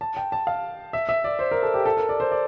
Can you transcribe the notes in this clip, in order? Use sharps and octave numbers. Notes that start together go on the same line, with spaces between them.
A5
G5
A5
F5
E5
E5
D5
C5
A#4
A4
G4
A4
A#4
D5
C5
D5